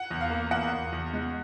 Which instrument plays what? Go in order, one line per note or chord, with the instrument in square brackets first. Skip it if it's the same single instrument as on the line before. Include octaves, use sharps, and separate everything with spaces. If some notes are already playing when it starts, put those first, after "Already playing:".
Already playing: [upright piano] F#5
[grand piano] E2
[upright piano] F5
[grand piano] A#3
[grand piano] E2 [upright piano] F#5
[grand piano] E2
E2
G#3